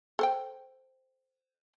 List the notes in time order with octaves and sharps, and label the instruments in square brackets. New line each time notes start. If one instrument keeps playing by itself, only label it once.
[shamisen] A4 C5 G5